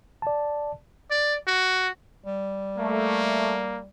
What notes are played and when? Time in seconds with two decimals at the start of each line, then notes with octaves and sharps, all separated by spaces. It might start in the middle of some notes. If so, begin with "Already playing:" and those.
0.22 D5 A5
1.11 D5
1.47 F#4
2.26 G3
2.77 A3 A#3